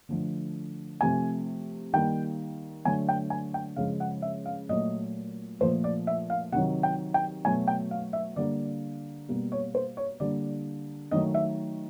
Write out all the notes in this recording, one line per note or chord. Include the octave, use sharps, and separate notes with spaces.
D3 F3 A3
C3 F3 A3 G#5
D#3 G3 A#3 G5
D3 F#3 A3 G#5
G5
G#5
G5
C#3 F3 G#3 F5
F#5
E5
F5
A#2 F#3 A3 D#5
A#2 F3 A3 C5
D5
E5
F5
C3 D#3 F#3 F#5
G5
G5
B2 F#3 A3 G#5
G5
F5
E5
D3 G3 A#3 D5
B2 G3 A#3
C#5
C5
C#5
D3 G3 A#3 D5
D#3 F#3 A3 D#5
E5